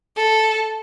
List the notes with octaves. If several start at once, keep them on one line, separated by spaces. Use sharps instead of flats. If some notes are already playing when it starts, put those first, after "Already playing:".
A4